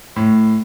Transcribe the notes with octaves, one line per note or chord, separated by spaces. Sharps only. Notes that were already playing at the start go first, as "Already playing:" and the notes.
A2